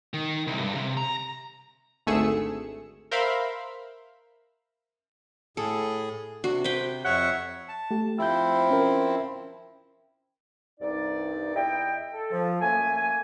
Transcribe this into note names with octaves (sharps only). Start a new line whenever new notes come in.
D#3
C2
G2
C3
A#5
G#1 D2 A3 G#4 E6 C#7
A#4 C5 E5 F5 B5 C6
A2 G#4 A4
C3 D4 F#4
B4 C5 G5
F2 C#5 E5 F#5
A5
A3 G4
F3 C4 E4 E6 G6
C#4 A#4
C2 G2 D#4 D5
E2 E4 D#5 G5
A4
F3
F#2 A3 A#3 G#5